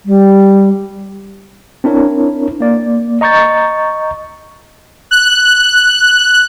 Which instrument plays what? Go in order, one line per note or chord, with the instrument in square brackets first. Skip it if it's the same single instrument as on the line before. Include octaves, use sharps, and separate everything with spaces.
[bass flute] G3
[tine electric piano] C4 D4 E4 A#4 C#5
A#3 D5
D#5 A#5 C#6 G6 A6
[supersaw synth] F#6